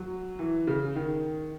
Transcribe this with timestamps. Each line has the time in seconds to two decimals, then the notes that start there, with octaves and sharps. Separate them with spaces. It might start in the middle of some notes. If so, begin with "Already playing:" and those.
Already playing: F#3
0.39 E3
0.67 C#3
0.95 D#3